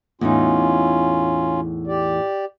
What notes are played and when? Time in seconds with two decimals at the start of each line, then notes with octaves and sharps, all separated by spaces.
0.21 E2 A2 C#4 D#4 F4
1.87 G4 D5